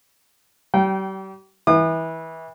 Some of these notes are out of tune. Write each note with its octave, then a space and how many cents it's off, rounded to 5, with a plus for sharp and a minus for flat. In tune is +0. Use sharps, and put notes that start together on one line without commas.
G3 -40 G5 -20
E3 -25 D#6 -40